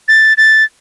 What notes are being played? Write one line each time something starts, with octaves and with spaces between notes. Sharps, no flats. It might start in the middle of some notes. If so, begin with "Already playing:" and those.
A6
A6